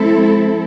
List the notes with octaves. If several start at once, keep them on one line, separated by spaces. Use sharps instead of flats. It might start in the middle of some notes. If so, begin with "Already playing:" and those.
Already playing: F3 G#3 C4 E4 A4